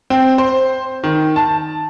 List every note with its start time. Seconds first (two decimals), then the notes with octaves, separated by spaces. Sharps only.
0.10 C4
0.38 C5
1.04 D#3
1.36 A5